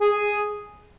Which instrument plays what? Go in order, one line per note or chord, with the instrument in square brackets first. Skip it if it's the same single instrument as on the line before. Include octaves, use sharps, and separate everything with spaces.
[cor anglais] G#4